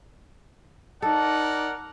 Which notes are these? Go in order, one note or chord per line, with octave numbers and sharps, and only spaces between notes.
D#4 A4 A#4 D5 F#5